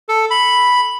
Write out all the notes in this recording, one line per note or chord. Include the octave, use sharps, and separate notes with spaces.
A4
B5